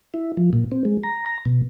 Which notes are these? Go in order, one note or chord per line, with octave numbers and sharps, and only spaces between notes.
E4
F3
A#2
C4
G#3
A#5
A#5
B2